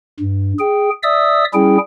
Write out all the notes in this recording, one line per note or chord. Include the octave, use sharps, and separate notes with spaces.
G2
G#4 G5
D5 E5 D#6 E6
G3 C#4 E4 G#4 G5